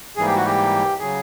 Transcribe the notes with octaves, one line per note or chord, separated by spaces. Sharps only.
G#2 E3 G3 A#3 G#4
G4
F#4
G4
C#3 F#3 G#4